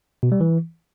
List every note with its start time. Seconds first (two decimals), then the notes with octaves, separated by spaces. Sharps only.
0.23 B2
0.32 G3
0.41 E3